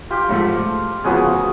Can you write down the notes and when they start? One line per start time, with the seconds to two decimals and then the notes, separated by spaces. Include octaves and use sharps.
0.10 F4 G4
0.29 G#2 F3 A3
1.04 D2 C#3 F3 G#3 B3 F#4 G#4